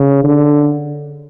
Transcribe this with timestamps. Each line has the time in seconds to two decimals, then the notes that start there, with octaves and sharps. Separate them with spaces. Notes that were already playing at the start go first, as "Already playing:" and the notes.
Already playing: C#3
0.24 D3